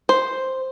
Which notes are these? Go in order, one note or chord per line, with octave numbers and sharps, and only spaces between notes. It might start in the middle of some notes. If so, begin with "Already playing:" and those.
C5